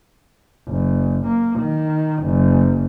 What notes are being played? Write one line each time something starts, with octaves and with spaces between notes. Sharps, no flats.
F#1
A#3
D#3
F#1